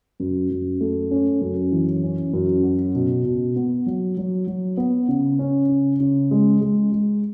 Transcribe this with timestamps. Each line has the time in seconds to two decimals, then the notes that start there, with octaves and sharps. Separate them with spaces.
0.20 F#2
0.51 F#2
0.81 A3
1.11 C#4
1.41 F#2
1.72 E3
2.04 C#4
2.33 F#2
2.63 F#4
2.95 B2
3.25 B2
3.56 B3
3.86 F#3
4.17 F#3
4.47 F#3
4.77 B3
5.08 C#3
5.39 C#4
5.69 C#3
6.00 C#3
6.31 G#3
6.61 G#3
6.92 G#3